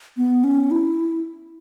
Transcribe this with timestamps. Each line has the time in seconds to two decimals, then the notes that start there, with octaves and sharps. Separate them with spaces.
0.17 B3
0.44 C#4
0.71 E4